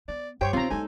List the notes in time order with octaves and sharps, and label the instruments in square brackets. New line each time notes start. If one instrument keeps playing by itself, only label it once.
[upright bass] B3 [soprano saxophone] D5
[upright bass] G2 [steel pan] G4 C5 C#5 [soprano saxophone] G5
[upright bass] D3 D#3 [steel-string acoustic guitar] C4 [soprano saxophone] F4 [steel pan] A#5 C6
[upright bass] G#3 A#3 [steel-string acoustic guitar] D#4 A4 [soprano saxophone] G#5